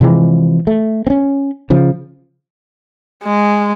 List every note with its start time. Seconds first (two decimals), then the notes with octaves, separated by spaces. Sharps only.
0.01 C3 E3 F3 G#3
0.67 A3
1.07 C4 C#4
1.70 C#3 F3
3.24 G#3